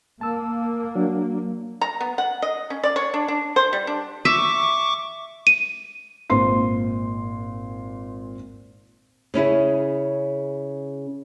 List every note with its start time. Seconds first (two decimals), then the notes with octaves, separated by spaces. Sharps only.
0.21 A#3 A5 E6
0.95 F#3 D4
1.81 A#5
2.01 B3
2.18 F#5
2.42 D#5
2.70 C#4
2.83 D5
2.96 C#5
3.14 D4
3.28 D4
3.56 C5
3.73 G3
3.87 D4
4.25 E5 C#6 D6
5.47 D#7
6.30 G#1 A#2 C5 C6 C7
9.34 C#3 C#4 E4 G#4